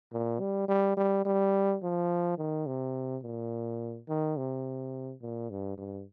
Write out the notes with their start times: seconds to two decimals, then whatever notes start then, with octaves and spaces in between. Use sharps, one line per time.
0.13 A#2
0.40 G3
0.68 G3
0.97 G3
1.25 G3
1.82 F3
2.38 D#3
2.67 C3
3.23 A#2
4.08 D#3
4.37 C3
5.22 A#2
5.50 G2
5.78 G2